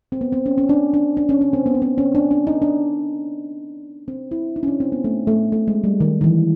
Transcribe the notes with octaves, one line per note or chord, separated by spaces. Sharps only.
C4
B3
C4
C#4
C#4
D4
D4
D4
C#4
C#4
C4
B3
C#4
C4
C#4
D4
D4
D#4
D4
C4
E4
D#4
C#4
D4
C4
B3
A3
A3
A3
G#3
G3
D#3
D#3
E3